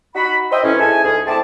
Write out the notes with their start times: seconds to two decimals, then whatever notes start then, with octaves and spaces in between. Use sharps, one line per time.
0.15 D#4 F#4 B5
0.51 C5 D#5 E5 G5
0.63 A2 E3 C#4
0.79 G#2 G#3 E4 A4 G#5
1.04 D2 G#4
1.27 G#2 A3 C4 E4 D5 A5